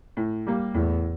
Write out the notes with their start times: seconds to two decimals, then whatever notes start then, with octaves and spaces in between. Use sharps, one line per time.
0.17 A2
0.47 G3 A#3
0.74 E2 A2